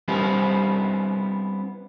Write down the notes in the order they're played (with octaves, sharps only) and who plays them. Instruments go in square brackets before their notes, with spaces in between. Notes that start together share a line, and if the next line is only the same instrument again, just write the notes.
[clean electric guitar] G3 B3 C4 E4